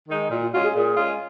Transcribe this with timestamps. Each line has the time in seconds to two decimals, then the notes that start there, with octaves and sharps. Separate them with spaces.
0.09 D#3 G#3 D#4
0.30 A#2 F4
0.42 F4
0.53 G#3 C#4 F4 F#4
0.63 G#4
0.74 A#2 G#4
0.97 G#3 C#4 F4